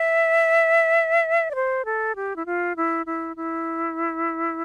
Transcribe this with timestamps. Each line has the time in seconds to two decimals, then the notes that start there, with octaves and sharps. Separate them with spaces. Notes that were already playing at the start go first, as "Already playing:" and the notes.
Already playing: E5
1.51 D5
1.55 C5
1.85 A4
2.16 G4
2.36 E4
2.46 F4
2.76 E4
3.06 E4
3.36 E4